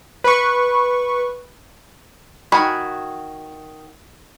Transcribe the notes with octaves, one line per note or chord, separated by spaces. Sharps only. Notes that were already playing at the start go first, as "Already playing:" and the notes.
B4 C#6
D#3 F#4 G#5 B5